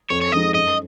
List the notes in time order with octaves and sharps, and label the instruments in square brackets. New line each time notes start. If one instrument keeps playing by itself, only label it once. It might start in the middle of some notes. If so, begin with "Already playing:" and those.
[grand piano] F2 [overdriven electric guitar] C#5
[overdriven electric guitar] C#5
[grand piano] F3 G#3 D#4 [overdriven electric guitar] D#5
[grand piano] F#2 [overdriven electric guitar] D#5